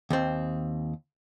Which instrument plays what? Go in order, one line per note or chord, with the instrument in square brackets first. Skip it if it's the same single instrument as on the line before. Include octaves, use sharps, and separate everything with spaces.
[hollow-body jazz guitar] D#2 C4